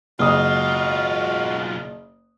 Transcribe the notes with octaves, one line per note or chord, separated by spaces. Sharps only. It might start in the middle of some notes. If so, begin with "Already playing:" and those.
F#1 B1 G#3 F4 F#4 D#6